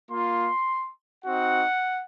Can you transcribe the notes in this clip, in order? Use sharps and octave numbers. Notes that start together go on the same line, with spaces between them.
A#3 F4 C6
C4 D#4 F#4 F#5